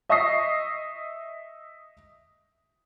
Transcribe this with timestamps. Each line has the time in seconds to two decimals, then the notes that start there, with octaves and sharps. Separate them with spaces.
0.09 D#5 E5 C#6 D#6 A#6 C7